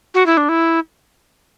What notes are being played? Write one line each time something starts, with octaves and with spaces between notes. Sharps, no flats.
F#4
E4
D4
E4